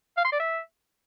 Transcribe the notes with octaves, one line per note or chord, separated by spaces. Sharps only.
F5
C6
D5
E5